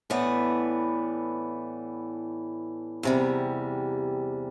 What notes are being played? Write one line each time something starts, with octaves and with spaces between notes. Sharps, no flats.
A2 E3 B3 D4
E2 C3 G3